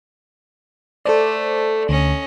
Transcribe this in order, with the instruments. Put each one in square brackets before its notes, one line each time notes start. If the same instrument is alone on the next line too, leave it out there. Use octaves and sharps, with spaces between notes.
[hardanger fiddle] A3 [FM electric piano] A4 C5 D5
[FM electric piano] D2 [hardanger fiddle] C#4 D#5